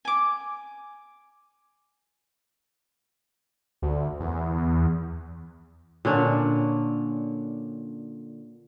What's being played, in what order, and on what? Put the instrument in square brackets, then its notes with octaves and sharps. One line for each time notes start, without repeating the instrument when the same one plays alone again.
[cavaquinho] G#5 D6
[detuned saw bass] D2
E2
[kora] A#2 D3 C#4 D4